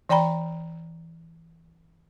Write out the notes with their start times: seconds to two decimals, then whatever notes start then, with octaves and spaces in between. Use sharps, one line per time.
0.09 E3 D5 G5 A#5 B5